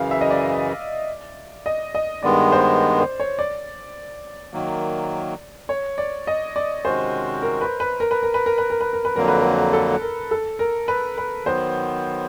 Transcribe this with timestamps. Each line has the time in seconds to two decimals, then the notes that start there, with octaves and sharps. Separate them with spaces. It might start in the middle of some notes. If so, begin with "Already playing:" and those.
Already playing: F#2 C#3 E3 F5
0.11 E5
0.21 D#5
0.31 D5
1.66 D#5
1.95 D#5
2.22 G2 D#3 G#3 B3 D5
2.52 C5
3.00 C5
3.20 C#5
3.39 D5
4.53 D#3 F#3 A#3
5.69 C#5
5.98 D5
6.27 D#5
6.56 D5
6.85 C3 D#3 G#3 C#4 F#4 C5
7.42 A#4
7.61 B4
7.80 B4
8.00 A#4
8.11 B4
8.23 A#4
8.34 B4
8.46 A#4
8.58 B4
8.70 A#4
8.81 B4
8.93 A#4
9.05 B4
9.15 F2 D3 F#3 A#3 A#4
9.28 B4
9.40 A#4
9.73 A4
10.01 A#4
10.31 A4
10.59 A#4
10.88 B4
11.18 B4
11.46 D#3 F#3 B3 C5